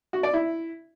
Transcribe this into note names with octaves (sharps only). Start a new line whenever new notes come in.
F#4
D5
E4